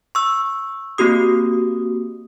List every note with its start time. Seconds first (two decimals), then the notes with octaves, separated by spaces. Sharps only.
0.15 C#6 E6
0.98 A#3 C4 F#4 G4 D#6